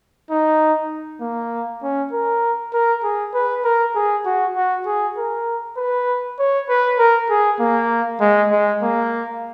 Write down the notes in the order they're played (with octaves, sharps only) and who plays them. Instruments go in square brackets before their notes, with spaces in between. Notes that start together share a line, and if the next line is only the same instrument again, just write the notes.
[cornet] D#4
A#3
C#4
A#4
A#4
G#4
B4
A#4
G#4
F#4
F#4
G#4
A#4
B4
C#5
B4
A#4
G#4
A#3
G#3
G#3
A#3